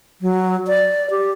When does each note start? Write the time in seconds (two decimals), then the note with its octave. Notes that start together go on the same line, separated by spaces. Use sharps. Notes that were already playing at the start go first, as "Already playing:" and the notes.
0.21 F#3
0.68 D5
1.11 G4